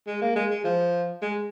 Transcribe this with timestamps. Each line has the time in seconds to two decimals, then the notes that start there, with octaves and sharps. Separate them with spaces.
0.07 G#3
0.22 A#3
0.36 G#3
0.50 G#3
0.64 F3
1.22 G#3